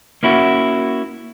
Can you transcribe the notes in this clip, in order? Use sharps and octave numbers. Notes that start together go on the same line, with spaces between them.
A#3 C#4 E4 F#4